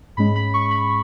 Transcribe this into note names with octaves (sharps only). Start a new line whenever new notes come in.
G#2 G#3 C#4 B5
B5
C#6
B5